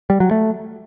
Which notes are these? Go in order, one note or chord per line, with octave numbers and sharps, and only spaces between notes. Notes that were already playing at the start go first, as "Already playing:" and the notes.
G3
F#3
A3